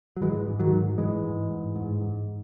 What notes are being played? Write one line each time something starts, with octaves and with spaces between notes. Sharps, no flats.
F#3
G#2 E3 G#3
G#2
D#3 F#3
G#2
G#2 E3 G#3
G#2
G#2
G#2
G#2